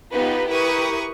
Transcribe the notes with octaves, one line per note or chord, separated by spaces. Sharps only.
B3 D#4 F4 G4 B4
E4 G4 A#4 B4 C#6 D#6